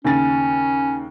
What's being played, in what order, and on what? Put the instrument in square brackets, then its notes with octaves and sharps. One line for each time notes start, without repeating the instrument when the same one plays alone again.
[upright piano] D#2 C#3 A6 [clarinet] C#4